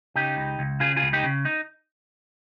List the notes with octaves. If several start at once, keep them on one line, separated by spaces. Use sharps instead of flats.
C#3 D#4 G4
C#2
C#2
C#3 F4 G#4
F4 G#4
C#2
D#4 G4
C#3
D#4